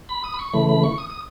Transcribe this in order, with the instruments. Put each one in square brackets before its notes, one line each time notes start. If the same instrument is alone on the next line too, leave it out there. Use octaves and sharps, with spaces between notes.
[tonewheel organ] B5
D#6
B5
C#6
C#3 E3 A3 B5
B5
C#6
D#6
D#6